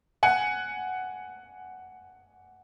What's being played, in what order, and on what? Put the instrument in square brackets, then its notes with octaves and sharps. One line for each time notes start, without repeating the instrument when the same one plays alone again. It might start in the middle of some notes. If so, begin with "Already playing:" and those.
[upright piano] F#5 G#5